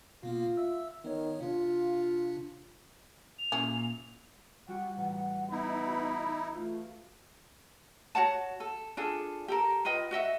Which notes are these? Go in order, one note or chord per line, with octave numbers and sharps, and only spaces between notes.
B2 A#3 B3 F4
E5 E6
D#3 B3 C#5
C3 D4 F4
F7
A#2 C#4 E4 G#4
G3 F#4 G4 F#5
A1 F#5
B3 D#4 E4 B5
F#4
A3 F4
F#4 C#5 F#5 A5
A4
D4 F4 G#4 A4
G4 A4 A#4
F4 B4 D#5 G5
F#4 D#5 E5 F#5